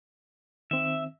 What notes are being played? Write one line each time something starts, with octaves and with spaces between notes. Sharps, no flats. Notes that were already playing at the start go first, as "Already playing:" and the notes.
D#3 C4 E5